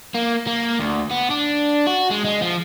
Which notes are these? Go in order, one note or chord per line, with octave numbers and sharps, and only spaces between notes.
A#3
A#3
D2
B3
D4
F#4
G#3
G#3
F3